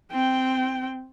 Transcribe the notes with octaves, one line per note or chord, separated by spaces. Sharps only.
C4 G5